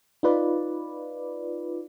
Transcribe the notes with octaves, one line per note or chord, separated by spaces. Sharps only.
D#4 F4 B4 D5